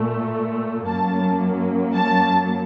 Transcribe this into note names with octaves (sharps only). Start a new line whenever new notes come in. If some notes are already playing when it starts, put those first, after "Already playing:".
Already playing: A#2 A3
F#2 F#3 A#3 A5
A5